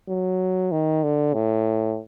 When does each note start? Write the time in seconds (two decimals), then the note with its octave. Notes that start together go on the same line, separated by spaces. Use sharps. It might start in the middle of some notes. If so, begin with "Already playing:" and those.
0.08 F#3
0.72 D#3
1.03 D3
1.34 A2